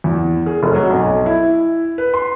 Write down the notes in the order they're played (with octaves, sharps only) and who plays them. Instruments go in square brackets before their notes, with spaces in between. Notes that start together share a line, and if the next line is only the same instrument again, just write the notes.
[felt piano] E2
G#4
F1
F#3
B1
E4
B4
C6